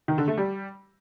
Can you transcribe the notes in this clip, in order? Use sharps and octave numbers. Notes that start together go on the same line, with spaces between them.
D#3
D3
A3
G3